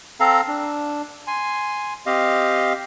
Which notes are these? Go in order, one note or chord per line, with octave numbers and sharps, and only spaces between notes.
C4 A4 F5 A#5
D4
G#5 C6
C4 G4 D#5 F5